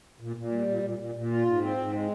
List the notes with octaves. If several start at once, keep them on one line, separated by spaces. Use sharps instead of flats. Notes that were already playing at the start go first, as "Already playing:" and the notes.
A#2
A#2
G3
A#2
A#2
A#2
A#2
F4
G#2
C4
G#2
G#3